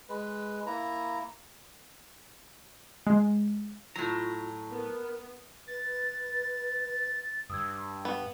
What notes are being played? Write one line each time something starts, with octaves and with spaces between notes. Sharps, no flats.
G#3 B4
A#3 E4 A#5
G#3
A2 F#3 F4 A#5
B3 A#4
B4 A6
G2 D#6 E6 G#6
B3